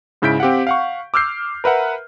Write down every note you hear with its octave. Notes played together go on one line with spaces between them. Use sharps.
G#2 C#3 E4 G6 B6 D7
C4 G4 F5 F#5
F5 F#5 C#6
D6 E6 F6 G6 C7
A#4 B4 E5 F#5